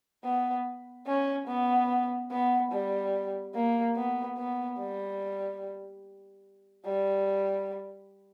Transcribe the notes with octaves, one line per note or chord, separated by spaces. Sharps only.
B3
C#4
B3
B3
G3
A#3
B3
B3
G3
G3